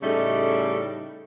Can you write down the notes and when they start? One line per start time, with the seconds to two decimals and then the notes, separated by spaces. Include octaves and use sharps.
0.02 A2 C#3 G3 A3 D#4 A4